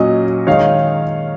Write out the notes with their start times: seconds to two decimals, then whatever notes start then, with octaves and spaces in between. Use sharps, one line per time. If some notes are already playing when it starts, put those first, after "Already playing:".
Already playing: A#2 F#3 C#4 D#5
0.47 D#3 G#3 D#4 C#5 F5